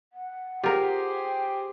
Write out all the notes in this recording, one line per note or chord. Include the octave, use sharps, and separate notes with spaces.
F#5
F4 G4 G#4 A#4 C5
G5